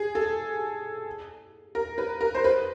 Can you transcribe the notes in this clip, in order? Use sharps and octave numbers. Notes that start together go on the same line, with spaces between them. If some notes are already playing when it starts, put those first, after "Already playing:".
Already playing: G#4
A4
A#4
B4
A#4
C5
B4